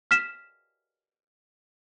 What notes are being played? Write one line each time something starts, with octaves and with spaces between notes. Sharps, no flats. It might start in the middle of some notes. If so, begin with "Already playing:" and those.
F6 B6 E7